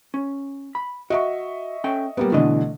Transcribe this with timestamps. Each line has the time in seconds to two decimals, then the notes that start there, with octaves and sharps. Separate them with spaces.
0.14 C#4
0.75 B5
1.10 F#4 D#5 E5 C#6
1.84 C#4 A4 G5
2.17 B1 G3 A#3 B3
2.32 B2 D3 E3 A3 D4 D#5